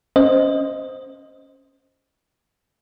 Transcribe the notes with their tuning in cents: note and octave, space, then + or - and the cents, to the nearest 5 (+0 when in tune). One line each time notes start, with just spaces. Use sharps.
C#4 +0 C5 +0 D#5 +0